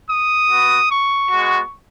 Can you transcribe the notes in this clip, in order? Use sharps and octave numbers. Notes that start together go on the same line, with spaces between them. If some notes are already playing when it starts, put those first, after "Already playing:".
D#6
B3 F#4
C#6
G#3 B3 F#4